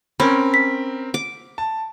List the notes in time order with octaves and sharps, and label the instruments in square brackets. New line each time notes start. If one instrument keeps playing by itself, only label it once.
[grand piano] C4 A#4 [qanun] C#4 [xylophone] B5
[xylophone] B6
[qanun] D6
[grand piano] A5